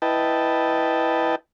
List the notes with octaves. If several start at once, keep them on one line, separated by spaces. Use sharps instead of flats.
E4 B4 D#5 G5 A5